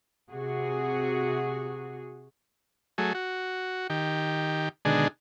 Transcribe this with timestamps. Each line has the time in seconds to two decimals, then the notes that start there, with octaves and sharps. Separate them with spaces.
0.30 C3 F#4 G#4
2.98 F#3 A3 G#4
3.15 F#4
3.90 D#3 G4
4.85 B2 D3 D#3 G#3 D4 G#4